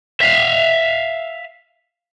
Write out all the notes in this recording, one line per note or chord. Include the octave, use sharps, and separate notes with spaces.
E5 F5